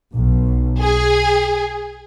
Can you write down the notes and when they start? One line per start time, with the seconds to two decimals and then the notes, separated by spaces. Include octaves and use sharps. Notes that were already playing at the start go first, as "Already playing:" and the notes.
0.13 B1
0.81 G#4